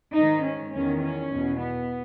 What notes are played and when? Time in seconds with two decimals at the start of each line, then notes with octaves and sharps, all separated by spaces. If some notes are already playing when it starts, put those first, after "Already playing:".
0.15 G#2 D#3 D#4
0.44 C#4
0.72 E2 D#3 C#4
1.01 C#4
1.30 E2 B2
1.58 B3